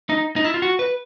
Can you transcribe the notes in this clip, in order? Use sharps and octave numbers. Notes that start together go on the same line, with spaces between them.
D#4
D#4
E4
F4
F#4
B4